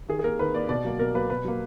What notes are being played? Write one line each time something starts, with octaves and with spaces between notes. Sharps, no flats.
D#3 G#4
G#4
A#3 A#4
D#3 B4
A#3 D5
B2 D5
F#3 A#3
B2 A#4
F#3 A#3 B4
B2 B4
F#3 A#3